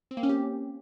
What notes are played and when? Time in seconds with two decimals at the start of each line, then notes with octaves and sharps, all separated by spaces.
0.11 C4
0.17 A#3
0.23 C#4
0.29 G4